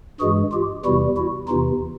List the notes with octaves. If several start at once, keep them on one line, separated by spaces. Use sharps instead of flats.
G2 E3 G#3 F#4 G#4
F4 G4
E2 C3 E3 G3 E4 F#4
E4 F#4
E2 C3 E3 D#4 F4